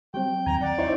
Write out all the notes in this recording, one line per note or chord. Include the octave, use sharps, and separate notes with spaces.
F#3 G3 C4 G5
D#2 G#5 A#5
D5 F#5
D#4 E4 C5 C#5